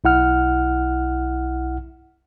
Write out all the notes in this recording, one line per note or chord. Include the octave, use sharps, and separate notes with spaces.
B1 E4 F#5 F6